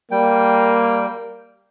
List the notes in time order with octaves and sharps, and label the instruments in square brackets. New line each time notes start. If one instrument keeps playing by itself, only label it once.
[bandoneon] G3 G5 [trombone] A#3